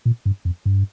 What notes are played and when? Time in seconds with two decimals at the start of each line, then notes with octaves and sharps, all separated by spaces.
0.05 A#2
0.26 G2
0.45 F2
0.66 G2